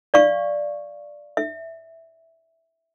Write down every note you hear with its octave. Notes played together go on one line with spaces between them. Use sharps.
D5 F5 C#6
E5